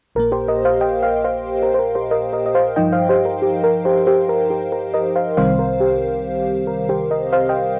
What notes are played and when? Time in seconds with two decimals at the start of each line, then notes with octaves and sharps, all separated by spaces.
0.15 A#1 A#2 A#3 A#4
0.32 G4 C5
0.48 A#4 D#5
0.65 C5 F5
0.81 D#5 G5
1.03 C5 F5
1.24 C5 F5
1.63 A#4
1.74 C5
1.79 A#4
1.95 G4 C5
2.11 A#4 D#5
2.33 A#4 D#5
2.46 D#5
2.55 C5 F5
2.76 G2 F3 D#4 D#5 G5
2.93 C5 F5
3.09 G4 C5
3.25 A#4
3.42 G4
3.64 A#4
3.85 G4 C5
4.07 G4 C5
4.29 A#4
4.50 G4
4.72 A#4
4.94 A#4 D#5
5.16 C5 F5
5.37 C2 C3 D#3 G3 C4 C5 F5
5.59 A#4
5.80 G4
6.67 A#4
6.89 G4 C5
7.11 A#4 D#5
7.33 C5 F5
7.49 D#5 G5